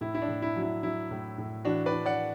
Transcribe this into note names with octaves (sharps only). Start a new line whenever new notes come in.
A2 E4
E4
D4
A2
E4
F#3
E4
F#3 E4
A2
A2
E3 D4 F#4
B4 D5
E3
D5 F#5